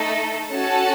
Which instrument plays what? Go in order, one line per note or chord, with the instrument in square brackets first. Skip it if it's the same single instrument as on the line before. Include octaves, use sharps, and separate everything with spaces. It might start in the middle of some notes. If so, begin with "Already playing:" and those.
Already playing: [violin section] A3 D#4 A4
C#4 F#4 A4 A5